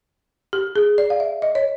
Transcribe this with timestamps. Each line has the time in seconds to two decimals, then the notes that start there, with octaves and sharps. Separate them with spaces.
0.53 G4
0.76 G#4
0.98 D5
1.10 F5
1.20 E5
1.42 D#5
1.55 C#5